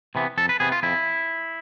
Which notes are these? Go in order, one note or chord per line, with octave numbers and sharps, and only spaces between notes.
C3 E3 B3
F2 A4
B4
C3 E3 B3 G#4
F4
F2 E4